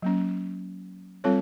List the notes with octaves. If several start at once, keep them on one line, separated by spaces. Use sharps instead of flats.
F#3 A#3 C#4
G3 C4 F4 A4 C#5